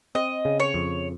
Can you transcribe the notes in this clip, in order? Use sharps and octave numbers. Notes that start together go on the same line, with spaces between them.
C4 D#5
C#3
C#5
F2